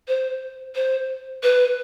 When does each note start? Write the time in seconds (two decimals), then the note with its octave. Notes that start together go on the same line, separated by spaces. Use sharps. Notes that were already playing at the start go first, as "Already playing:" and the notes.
0.08 C5
0.75 C5
1.43 B4